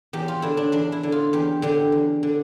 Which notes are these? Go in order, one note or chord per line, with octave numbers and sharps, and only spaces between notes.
E2 G4
F4
D3 E4
D4
E2 D4
E4
D3
F4
E2 G4
D3 G4
E2
D3